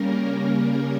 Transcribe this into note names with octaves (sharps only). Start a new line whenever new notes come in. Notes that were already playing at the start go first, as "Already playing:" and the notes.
Already playing: C#3 G3 A#3 C#4 A#4
A#4